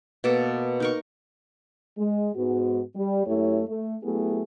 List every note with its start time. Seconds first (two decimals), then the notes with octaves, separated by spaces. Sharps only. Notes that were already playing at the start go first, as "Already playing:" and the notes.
0.24 B2 A#3 A4 D6
0.80 D#4 A#4 C#6
1.98 G#3
2.36 G#2 B3 F#4
2.96 G3
3.26 F#2 A3 E4 G4 C#5
3.67 A3
4.03 F#3 A3 B3 E4 G4 G#4